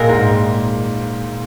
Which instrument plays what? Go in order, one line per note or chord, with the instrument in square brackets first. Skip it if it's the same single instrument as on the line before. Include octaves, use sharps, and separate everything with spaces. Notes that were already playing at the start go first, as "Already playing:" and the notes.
Already playing: [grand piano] A#2 [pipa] G#3 C4 F4 A#4
[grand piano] G#2